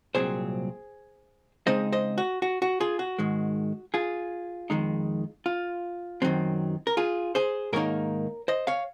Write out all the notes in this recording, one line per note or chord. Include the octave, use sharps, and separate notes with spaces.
C2 A#2 F#3 C4 G#4 C5
C#3 G#3 C4 D#4 C5 D#5
C5 D#5
F#4
F#4
F#4
F4 G#4
F#4
G#2 D#3 G#3
F4 G#4
F2 D#3 G#3 D#4
F4
F#2 D#3 F#3 C4
A#4
F4 G#4
G#4 C5
G#2 D#3 A#3 D#4 A#4 C#5
C5 D#5
C#5 F5